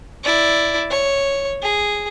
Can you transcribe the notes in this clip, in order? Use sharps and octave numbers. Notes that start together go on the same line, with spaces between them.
E4 D5
C#5
G#4